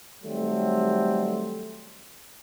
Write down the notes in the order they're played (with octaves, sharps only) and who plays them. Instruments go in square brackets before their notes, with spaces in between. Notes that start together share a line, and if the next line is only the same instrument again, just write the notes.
[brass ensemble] D#3 F#3 G3 A3 C4